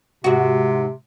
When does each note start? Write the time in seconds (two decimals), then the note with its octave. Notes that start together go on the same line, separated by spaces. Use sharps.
0.24 G#2 C3 F#4